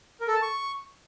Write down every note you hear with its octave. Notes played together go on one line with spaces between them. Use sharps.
A#4
A4
A5
C#6